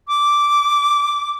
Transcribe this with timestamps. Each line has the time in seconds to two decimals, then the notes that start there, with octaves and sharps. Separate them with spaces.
0.08 D6